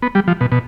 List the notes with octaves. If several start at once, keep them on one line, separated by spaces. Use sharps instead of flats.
B3
G3
F3
B2
B2